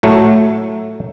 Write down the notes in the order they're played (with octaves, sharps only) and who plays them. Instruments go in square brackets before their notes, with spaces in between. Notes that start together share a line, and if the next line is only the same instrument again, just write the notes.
[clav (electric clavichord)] A2 F#3 A3